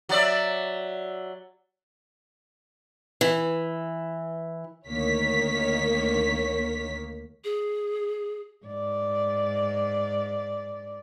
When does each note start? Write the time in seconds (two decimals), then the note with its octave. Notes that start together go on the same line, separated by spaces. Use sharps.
0.09 F#3 D5 E5
3.21 E3
4.87 D2 D#3 A#3 C#5 B6
7.44 G#4
8.66 G#2 D5